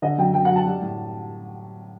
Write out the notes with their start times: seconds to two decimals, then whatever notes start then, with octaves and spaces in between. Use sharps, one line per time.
0.02 D3 D#5
0.18 F#2 G5
0.34 F#2 G5
0.45 F#5
0.49 F#3
0.56 A5
0.66 G3
0.82 A2